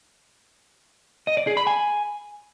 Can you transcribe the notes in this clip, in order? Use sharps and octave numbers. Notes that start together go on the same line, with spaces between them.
D#5
D5
G#4
B5
G#5